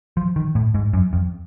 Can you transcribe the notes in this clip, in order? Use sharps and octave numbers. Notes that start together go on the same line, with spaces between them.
F3
D#3
A2
G#2
F#2
F2